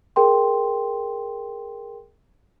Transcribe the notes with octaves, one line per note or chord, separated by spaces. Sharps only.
G#4 A#4 G5 C6